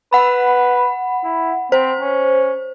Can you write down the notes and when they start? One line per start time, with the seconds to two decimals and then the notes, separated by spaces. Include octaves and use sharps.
0.13 B4 F#5 B5
1.24 E4
1.72 C4 C5
2.01 C#4